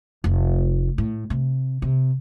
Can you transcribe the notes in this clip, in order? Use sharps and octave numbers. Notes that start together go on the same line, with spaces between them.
F1
A2
C3
C3